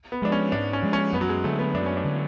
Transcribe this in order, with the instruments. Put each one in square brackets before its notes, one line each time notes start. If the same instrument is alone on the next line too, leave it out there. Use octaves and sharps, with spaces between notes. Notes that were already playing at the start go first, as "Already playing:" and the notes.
[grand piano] B3
[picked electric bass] F3 G#3 [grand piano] D4
[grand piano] C#4
[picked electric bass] G#2 [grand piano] D4
[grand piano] C#4
[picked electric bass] F3 G#3
[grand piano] C#4
[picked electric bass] F#2 [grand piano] B3
[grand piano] F#3
G#3
[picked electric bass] D3 F#3 [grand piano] A3
[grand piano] B3
[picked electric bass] F#2 [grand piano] D4
[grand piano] C#4
D4
[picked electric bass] D3 F#3